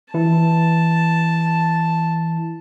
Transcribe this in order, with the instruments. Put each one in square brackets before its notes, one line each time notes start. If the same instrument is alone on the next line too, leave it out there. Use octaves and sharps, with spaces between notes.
[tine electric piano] E3 E4 [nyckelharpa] A5